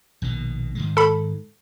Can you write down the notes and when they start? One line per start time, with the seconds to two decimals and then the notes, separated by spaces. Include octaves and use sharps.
0.22 A#1 B2 D#3
0.75 G#2 D#3 G#3
0.97 A4 B5